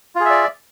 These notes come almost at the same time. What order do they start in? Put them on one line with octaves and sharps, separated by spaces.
F4 G#4 E5 D5